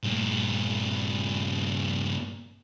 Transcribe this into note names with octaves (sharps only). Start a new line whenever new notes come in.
G2 A#2